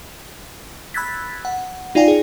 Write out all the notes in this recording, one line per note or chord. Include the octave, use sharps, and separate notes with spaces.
B5 E6 F#6 G#6 A6 B6
F#5
D#4 F4 D5 F5 G5 G#5
G#4